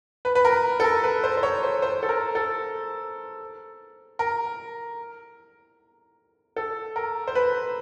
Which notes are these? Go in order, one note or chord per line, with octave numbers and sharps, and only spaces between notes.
B4
B4
A#4
A4
A#4
B4
C5
C5
C#5
C5
C5
A4
A#4
A4
A#4
A4
A#4
C5
B4